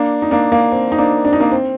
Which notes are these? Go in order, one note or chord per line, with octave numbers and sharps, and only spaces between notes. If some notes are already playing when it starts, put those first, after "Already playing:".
Already playing: A#3 D4
D#4
A#3 D4
A#3
C4
D#4
A#3 D4
D4
D#4
A#3 D4
C4